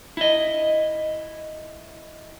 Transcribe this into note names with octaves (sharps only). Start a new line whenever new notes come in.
E4 D#5